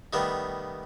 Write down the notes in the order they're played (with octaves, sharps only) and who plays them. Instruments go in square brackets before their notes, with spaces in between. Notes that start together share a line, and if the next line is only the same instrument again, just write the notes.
[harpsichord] D#3 G3 A3 B3